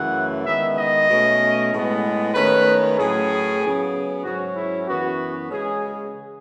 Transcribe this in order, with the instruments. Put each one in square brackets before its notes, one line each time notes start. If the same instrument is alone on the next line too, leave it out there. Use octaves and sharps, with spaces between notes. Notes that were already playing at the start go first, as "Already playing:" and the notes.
Already playing: [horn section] F#2 C#3 E3 A3 F#5
D#3 G#3 B3 E5
D#5
B2 A3 C#4
A2 G#3 B3
D#3 A3 C#4 B4
A2 F#3 C#4 G#4
C#3 F#3 B3
G#2 F#3 C#4 F#4
E4
F#2 E3 B3 F#4
C#3 G#3 C#4 G#4